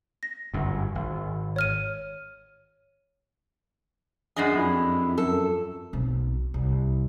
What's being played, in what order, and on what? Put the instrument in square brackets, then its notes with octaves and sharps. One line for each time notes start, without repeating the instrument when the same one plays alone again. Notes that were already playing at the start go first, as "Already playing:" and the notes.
[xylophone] A#6
[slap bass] G1 F#2
G#1
[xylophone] C#5 F6 D#7
[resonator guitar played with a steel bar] F#2 G#3 D4 [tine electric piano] G#4 D#5 C7
[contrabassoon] F2 [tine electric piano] E4
[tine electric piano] F#2 [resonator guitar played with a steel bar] A4
[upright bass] B1 C4
C2